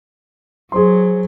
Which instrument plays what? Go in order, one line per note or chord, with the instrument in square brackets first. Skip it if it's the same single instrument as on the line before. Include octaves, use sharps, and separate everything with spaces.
[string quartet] F#3 [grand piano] G#4 C5 C6